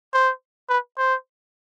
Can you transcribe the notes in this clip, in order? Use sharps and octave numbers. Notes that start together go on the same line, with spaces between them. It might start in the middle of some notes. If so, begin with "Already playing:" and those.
C5
B4
C5